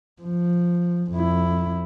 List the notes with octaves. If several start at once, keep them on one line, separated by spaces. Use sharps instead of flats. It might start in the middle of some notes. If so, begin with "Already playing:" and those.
F3
F2 E4